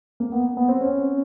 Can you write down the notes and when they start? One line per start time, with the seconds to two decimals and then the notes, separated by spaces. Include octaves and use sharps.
0.20 A#3
0.32 B3
0.57 B3
0.69 C4
0.81 C#4